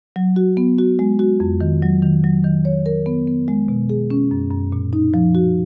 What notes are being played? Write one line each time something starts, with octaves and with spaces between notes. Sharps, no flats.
F#3
F#4
B3
F#4
G#3
F#4
F2
D#3
F#3
D#3
F#3
D#3
C#5
A#4
B3
B3
G#3
B2
G#4
C#4
F#2
F#2
A#2
D#4
F3
F#4